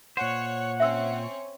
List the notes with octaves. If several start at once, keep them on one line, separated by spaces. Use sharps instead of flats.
A#2 C5 C#5 F#5
C4 C#4 C#5 E5 E6